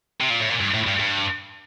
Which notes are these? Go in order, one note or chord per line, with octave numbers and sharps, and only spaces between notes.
C3
A#2
A2
A#2
G2
A2
G2
G2